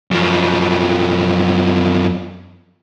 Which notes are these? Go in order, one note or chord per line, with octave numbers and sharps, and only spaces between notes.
F#2 F3